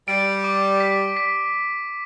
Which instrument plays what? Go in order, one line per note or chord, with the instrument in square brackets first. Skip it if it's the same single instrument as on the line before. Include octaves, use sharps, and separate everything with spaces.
[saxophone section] G3 [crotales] D7
[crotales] D6
B6
B6